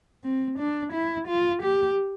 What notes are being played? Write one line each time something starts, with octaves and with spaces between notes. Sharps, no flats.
C4
D4
E4
F4
G4